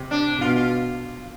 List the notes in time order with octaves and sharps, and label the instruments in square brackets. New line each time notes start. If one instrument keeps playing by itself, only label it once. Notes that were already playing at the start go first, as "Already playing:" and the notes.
Already playing: [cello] C3
[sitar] D4
[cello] B2 [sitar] F4
[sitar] F4